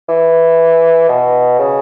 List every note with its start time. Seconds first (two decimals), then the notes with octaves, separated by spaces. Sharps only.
0.09 E3
1.08 B2
1.58 C#3